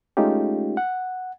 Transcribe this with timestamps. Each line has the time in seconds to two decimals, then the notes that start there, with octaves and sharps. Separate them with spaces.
0.17 G#3 A3 C#4 D#4 F4 G4
0.77 F#5